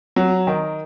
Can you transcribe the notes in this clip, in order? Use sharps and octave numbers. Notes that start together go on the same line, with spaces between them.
F#3
D#3